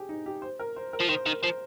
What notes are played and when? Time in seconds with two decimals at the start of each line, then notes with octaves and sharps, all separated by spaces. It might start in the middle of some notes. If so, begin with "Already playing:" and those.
Already playing: G4 G#4
0.09 D#4
0.26 G4
0.42 C5
0.59 A#4
0.76 C5
0.93 A#4
1.01 F3
1.09 D#3 C5
1.26 D#3 A#4
1.42 F3 C5